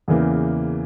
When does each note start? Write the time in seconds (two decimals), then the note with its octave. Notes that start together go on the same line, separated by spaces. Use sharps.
0.08 E2 C#3 E3 A#3